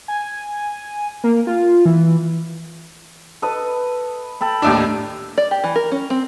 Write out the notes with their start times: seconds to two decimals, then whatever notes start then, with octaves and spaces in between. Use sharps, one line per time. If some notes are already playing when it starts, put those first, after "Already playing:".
0.08 G#5
1.24 A#3
1.47 F4
1.85 E3
3.42 A4 B4 D#5
4.41 A4 G5 B5
4.62 D#2 A2 D4
5.38 D5
5.51 G4
5.64 E3
5.76 A#4
5.91 C#4
6.10 C4